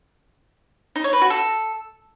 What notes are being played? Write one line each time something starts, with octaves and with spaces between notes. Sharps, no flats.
D#4
C#5
B4
F#4
A4